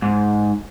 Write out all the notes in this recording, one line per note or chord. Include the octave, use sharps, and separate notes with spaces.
G#2